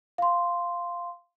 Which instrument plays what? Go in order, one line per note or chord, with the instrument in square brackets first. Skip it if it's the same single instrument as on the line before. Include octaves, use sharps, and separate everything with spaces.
[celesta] F5 C6